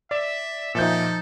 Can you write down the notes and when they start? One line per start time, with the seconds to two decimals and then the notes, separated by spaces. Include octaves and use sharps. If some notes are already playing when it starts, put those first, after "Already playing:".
0.11 D5 E5
0.75 A#2 F3 D#4 A4 E5 G6